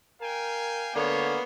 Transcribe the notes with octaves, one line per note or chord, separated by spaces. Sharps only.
A#4 F5 G5 G#5
D3 A#3 B3 C#5